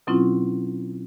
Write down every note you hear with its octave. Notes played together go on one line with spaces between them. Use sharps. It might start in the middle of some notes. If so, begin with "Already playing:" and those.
B2 F#3 C4 C#4 E4 F4